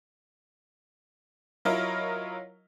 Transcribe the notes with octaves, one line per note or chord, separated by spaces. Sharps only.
F#3 E4 F4 A#4 C#5 D#5